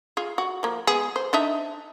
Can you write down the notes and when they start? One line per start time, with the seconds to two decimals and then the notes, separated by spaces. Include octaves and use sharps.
0.17 F4 G#4
0.38 F#4
0.63 F3 A#3
0.87 G#3 B3 G#4
1.16 C5
1.33 D4 D#4 E5